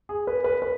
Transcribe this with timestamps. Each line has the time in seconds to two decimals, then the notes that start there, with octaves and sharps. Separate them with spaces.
0.09 G#4
0.27 B4
0.44 B4
0.62 B4